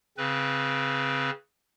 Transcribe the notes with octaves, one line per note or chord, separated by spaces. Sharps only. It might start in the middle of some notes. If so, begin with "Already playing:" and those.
C#3 C4 B4